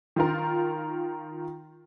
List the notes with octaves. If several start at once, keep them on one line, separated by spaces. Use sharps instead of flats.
D#3 F4 A#4